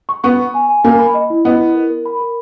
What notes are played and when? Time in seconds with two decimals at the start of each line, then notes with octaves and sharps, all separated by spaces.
0.09 C#6
0.24 B3 C#6
0.39 C#6
0.54 G#5
0.69 G#5
0.84 A#3 G#5
0.99 B5
1.14 D#5
1.30 E4
1.45 B3 D#5
1.60 E4
1.75 A#4
1.90 A#4
2.05 B5
2.21 A#4